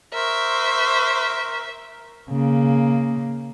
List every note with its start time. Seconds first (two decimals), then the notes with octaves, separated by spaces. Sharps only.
0.14 A#4 C5 E5 C#6
2.30 C#3 A#3